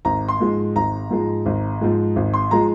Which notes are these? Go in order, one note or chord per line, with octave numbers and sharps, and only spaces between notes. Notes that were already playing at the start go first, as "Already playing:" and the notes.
G#1 A#5
C6
G#2 F3 G#3
G#1 A#5
G#2 F3 G#3
G#1
G#2 F3 G#3
G#1
C6
F3 G#3 A#5